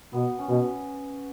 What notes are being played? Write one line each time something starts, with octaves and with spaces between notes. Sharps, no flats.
B2 B3
C#4
B2 B3